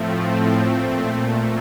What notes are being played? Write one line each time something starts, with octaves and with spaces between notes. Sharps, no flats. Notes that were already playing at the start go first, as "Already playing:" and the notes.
Already playing: A2 F3 A3 C4
A#2 A3
A#3